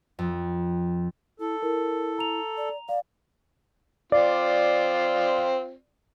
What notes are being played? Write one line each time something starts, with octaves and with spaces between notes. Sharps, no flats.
F2
E4 A4
E4 A#4
A#5 F7
D5
D5 F5
C4 F4 D5